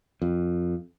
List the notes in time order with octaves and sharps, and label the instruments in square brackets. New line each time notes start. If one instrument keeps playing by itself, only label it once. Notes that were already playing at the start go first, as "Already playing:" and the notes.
[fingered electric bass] F2